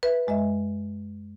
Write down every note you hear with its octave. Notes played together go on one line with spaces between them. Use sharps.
B4 E5
F#2 G#3 D#5 E5